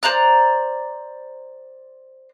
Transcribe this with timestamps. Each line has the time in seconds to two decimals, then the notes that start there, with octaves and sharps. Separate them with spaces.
0.03 C5 D5 A#5 F#6